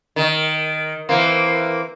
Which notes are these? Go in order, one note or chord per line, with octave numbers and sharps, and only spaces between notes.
D#3
E3 A#3 C4